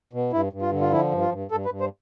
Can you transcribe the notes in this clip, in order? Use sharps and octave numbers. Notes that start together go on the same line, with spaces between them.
B2
G2 E4
G2
F4
D3
F4
F3 E4
G2
F4
G2
G2 A4
B4
G2
C5